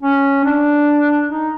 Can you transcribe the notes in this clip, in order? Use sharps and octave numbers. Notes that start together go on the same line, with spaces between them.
C#4
D4
D#4